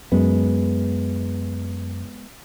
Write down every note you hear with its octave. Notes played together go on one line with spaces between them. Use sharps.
F#2 G#3 B3